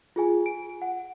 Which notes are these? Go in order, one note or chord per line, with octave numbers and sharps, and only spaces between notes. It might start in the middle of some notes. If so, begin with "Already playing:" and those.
F4 G#4 G#5
D7
F#5